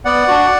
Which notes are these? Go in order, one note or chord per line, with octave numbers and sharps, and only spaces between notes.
B3 D5 F#5
D4 F#4